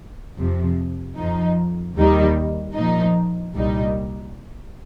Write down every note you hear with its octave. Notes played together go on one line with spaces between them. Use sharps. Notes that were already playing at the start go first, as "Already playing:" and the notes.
F2 C3 F3
F2 F3 D#4
D#2 D#3 G3 D#4
A#2 F3 D#4
C2 A#2 G3 D#4